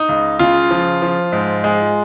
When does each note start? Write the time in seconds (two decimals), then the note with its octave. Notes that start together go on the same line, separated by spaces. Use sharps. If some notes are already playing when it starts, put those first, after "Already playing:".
Already playing: D#4
0.09 C#2
0.39 C#3 F4
0.71 F3
1.02 F3
1.32 G#2
1.64 G#3